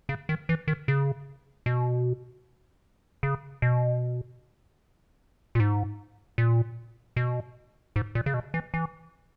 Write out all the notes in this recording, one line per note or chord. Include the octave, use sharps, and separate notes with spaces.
C#3
D#3
E3
D#3
C#3
B2
C#3
B2
A#2
G#2
A#2
B2
G#2
A#2
C#3
B2
E3
E3